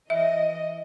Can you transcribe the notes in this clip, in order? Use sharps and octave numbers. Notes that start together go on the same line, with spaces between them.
E3 D#5 E5